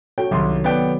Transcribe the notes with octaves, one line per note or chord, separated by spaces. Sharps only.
F#4 A4 C#5 G5
C2 C3 D#3 F#3 C6
B3 D5 G5